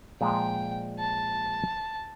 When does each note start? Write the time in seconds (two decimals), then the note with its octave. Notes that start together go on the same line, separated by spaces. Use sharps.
0.21 A#2 F3 G#3 G5
0.99 A5